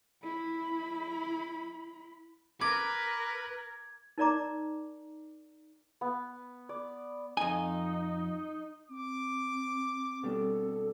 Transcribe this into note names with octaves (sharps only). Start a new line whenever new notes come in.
E4 B5
A#4 B4 D6 G#6
D#4 A#4 D5 D#5 A#5 D6
B3
D5
F2 D#4 G#5
C4 D6
B2 G3 D4 A4